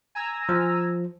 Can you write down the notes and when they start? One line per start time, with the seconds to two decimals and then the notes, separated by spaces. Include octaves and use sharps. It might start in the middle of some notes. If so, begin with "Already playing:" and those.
0.15 G#5 A#5 E6
0.49 F3